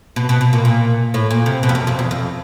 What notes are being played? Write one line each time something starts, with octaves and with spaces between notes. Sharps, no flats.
B2
B2
B2
A#2
A#2
A2
A#2
C3
B2
F2
F#2
F2
E2
F2